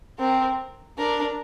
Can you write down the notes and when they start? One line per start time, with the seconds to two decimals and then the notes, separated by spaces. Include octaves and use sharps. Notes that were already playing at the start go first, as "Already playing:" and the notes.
0.19 C4 A#4
0.98 D4 A#4